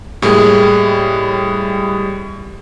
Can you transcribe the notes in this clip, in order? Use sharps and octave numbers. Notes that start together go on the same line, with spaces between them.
A2 G3 G#3 A#3 G#4